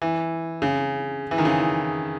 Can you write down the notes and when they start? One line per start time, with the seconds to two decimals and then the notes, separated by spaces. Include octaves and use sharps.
0.02 E3
0.62 C#3
1.31 E3
1.38 D#3
1.45 C#3